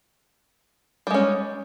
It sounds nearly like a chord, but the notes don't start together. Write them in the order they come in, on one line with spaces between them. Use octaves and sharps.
G3 G#3 C#4